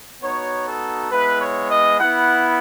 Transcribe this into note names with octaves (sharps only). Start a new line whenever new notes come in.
B3 D#4 F#4 C#5
A4
G#3 B3 E4 B4
C#5
D#5
B3 E4 F#5